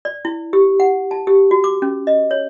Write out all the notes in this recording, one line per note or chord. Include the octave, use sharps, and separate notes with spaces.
D5
E4
G4
F#5
A5
G4
F#4
D6
C#4
D#5
C#5